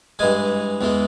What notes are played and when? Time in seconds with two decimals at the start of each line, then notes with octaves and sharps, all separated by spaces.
0.19 G2 E3 G#3 G#5
0.81 E2 E3 G#3